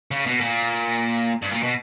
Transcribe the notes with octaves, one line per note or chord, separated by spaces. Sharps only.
C#3
B2
A#2
G2
A#2
B2